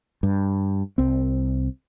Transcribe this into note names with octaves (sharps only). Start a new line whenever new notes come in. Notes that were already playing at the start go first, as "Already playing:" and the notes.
G2
C2 C4